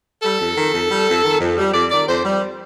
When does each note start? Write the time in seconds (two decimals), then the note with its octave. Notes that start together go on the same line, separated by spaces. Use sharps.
0.23 G3 A4
0.39 F2
0.57 D#3
0.73 F2
0.90 G3
1.07 F2
1.24 D#3
1.41 F2
1.58 G3
1.74 F2 D5
1.91 D#3 D5
2.08 F2 C5
2.25 G3